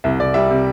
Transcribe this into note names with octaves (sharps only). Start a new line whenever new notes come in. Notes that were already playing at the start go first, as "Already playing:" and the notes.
C2 E5
C2 D5
G3 E5
C3